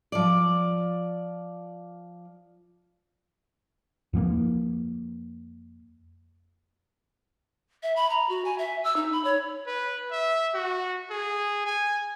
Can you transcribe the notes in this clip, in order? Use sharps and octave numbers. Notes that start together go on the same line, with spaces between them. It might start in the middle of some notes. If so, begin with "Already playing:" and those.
F3 D5
F2 F3 G#3 A#3
E5
B5
A#5
F#4
G#5
E5
E6
D#4
B5
C#5
B4
E5
F#4
G#4
G#5